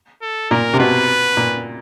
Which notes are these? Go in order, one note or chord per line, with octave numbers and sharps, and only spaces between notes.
A4
A#2 A#4
C3
B2 B4
A#2